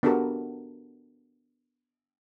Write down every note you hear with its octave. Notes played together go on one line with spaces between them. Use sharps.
B3 D4 F#4 G4 A4 A#4